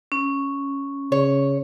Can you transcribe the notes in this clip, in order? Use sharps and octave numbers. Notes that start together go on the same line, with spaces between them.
C#4
C#3 C#5